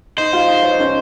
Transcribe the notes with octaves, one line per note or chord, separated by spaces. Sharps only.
D#4 C5 D#5
F4 F5
D#4 D#5
C#5
D#5
C#4 C#5